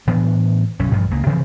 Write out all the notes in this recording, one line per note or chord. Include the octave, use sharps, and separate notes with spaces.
A2 E3 B3 D4
B1 F#2 C#4
A1 G2 F3
C#2 C#3 A#3
C3 E3 F3 C4